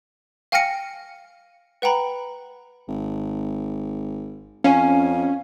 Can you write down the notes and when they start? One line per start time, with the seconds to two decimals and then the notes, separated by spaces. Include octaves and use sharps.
0.52 F5 G5 G#5 F6 A#6 C#7
1.82 B4 F#5 G5 A#5 B5
2.89 G#1
4.64 F2 C#4 F5 G#5